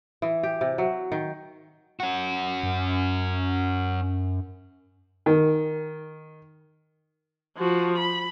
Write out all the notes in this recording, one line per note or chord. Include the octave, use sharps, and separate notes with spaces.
E3
G4
C3
F#3
D#3
C#4 F#4
F#2
D#3
F3 F#4
B5